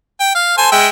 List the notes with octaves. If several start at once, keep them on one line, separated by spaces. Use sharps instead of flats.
G5
F5
A4 C5 G#5
G#3 E5 G5